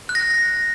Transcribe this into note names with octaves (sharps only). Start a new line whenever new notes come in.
F#6
A#6